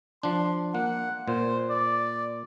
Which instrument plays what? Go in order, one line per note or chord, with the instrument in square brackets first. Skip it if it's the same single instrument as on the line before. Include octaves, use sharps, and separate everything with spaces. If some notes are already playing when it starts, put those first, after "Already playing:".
[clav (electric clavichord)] F3 D4 [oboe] C6
[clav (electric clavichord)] A#3 [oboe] F#5
[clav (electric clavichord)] A#2 [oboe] C5
[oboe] D5